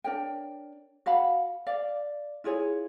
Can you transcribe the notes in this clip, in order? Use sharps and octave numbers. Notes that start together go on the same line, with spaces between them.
D4 A#4 C#5 G5
F#4 F5 F#5 B5
D5 F5
E4 F4 G#4 C#5